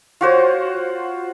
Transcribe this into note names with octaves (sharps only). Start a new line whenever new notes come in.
F4 F#4 C5 C#5